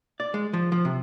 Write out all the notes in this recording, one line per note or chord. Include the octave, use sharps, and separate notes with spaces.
D5
G#3
F3
F3
C3